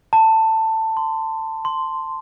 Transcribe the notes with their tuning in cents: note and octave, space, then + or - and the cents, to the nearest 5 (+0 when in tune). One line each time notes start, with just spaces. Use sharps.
A5 +15
C6 -15
C6 -5